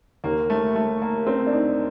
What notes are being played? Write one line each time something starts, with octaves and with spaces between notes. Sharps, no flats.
D#2 D#3 A#3
A3
A3
A#3
C4
D4
D#4